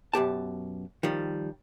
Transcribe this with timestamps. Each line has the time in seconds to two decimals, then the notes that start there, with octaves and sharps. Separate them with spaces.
0.14 F#2 B2 G4 A5
1.03 D#3 F3 G3